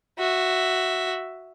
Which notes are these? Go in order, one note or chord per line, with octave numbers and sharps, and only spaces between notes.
F#4 E5